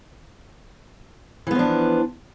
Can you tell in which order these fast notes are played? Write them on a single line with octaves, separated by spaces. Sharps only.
E3 B3 F3 D4